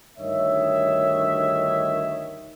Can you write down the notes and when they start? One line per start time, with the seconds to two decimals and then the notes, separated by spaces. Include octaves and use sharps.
0.19 D2 G2 D#3 C#5 D#5 E5